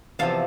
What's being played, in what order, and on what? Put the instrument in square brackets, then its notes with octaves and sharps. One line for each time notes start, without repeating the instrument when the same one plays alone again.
[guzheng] E2 C3 F3 F5 A5